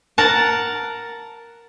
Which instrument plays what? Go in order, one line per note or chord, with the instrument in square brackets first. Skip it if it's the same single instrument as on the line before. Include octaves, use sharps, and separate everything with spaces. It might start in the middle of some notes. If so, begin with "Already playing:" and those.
[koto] A#4 F#5 A5